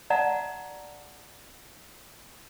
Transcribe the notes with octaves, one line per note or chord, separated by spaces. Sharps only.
D5 E5 F#5 A5 A#5